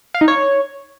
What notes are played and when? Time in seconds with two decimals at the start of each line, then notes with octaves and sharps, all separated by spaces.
0.14 F5
0.21 D#4
0.28 C#5